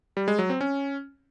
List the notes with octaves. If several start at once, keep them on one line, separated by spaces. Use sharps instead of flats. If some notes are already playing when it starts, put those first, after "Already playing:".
G3
G#3
F#3
C4
C#4